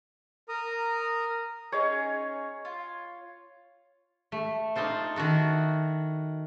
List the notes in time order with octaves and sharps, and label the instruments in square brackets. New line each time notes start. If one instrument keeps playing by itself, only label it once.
[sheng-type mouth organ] A#4 A#5 D#6
[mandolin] C#4 D#4 G#4 [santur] C#5
[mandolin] F4
[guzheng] A3
D4 D#4 F4 A4 C5
D#3 E4 F#4 A4